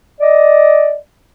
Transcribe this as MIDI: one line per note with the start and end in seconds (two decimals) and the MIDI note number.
0.20 0.95 74
0.20 0.95 75